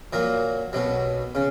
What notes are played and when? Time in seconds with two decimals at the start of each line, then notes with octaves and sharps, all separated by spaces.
0.13 A#2 F#3 A#3
0.73 B1 B2 F#3
1.35 C#3